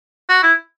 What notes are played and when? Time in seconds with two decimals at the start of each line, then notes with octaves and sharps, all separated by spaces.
0.29 F#4
0.43 E4